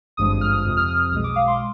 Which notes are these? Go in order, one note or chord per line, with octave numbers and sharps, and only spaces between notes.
G#1 G2 F3 G#3 D#6
D#6
F6
D#6
F2 C3 F3 D#6
F6
D#6
F6
B1 B2 G#3 D#6
D6
F5
C6